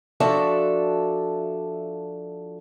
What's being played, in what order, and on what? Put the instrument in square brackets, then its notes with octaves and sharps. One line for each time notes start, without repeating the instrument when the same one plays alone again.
[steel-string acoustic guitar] F3 D4 F#4 A4 D5 E5